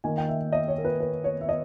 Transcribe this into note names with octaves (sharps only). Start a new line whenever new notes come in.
D#3 A#3 G#5
G5
E5
D#5
C#5
A#4
B4
B4
C#5
E5
D#5